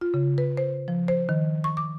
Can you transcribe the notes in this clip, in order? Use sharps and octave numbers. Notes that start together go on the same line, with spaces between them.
F4
C#3
B4
C5
F3
C5
D#3
C#6
D6